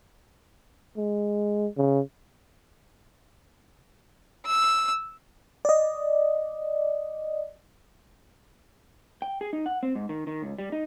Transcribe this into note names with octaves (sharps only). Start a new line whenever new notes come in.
G#3
C#3
E6
D5 D#5
G5
G#4
D#4
F#5
C4
G#2
D#3
D#3
C#2
G3
D#4